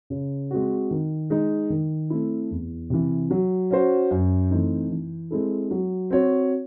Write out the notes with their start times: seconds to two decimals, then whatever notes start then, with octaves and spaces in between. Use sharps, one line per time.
0.10 C#3
0.51 G#3 C4 F#4
0.91 D#3
1.30 G#3 D#4
1.70 D#3
2.10 A3 C4 E4
2.51 E2
2.90 C3 E3
3.31 F#3
3.71 C#4 F#4 C5
4.11 F#2
4.51 E3 A3 C4 D#4
4.90 E3
5.30 G#3 C4 E4 A4
5.71 F#3
6.10 C4 F#4 C#5